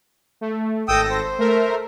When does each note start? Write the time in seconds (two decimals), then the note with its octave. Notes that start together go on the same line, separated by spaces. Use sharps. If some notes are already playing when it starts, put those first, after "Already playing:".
0.41 A3
0.88 G#1 A4 G5 D#6 E6 A#6
1.10 C5
1.39 A3 A#4 E5